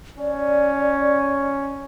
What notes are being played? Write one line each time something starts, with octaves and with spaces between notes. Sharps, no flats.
C#4 D5